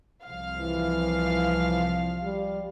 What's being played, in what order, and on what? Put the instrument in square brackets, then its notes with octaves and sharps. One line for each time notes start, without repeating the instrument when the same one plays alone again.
[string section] C2 F3 F5
[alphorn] E3
G3